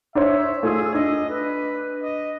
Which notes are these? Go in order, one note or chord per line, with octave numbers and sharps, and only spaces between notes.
D4 C5 C#5 E5
A3 F4 G#4 E6
D4 D#5
B4
D#5